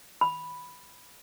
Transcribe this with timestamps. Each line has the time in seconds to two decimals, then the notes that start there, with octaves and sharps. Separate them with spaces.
0.21 B5